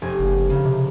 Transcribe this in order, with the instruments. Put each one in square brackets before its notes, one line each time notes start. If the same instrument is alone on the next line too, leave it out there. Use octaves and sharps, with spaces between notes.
[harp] F1 G#5
[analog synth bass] F#1
[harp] C#3
[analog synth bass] C3